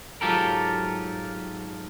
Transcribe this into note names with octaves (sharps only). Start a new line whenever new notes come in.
G#2 F#3 F4 G4 A4 A#4